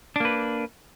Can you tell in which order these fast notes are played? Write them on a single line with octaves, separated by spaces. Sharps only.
D4 A#3 B4